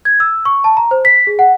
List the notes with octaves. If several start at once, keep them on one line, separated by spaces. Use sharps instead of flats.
G#6
E6
C#6
A5
A#5
C5
B6
G#4
F#5